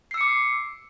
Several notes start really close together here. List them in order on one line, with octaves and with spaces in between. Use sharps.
C7 E6 C#7 D6